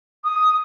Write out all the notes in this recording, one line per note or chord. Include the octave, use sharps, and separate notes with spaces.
D#6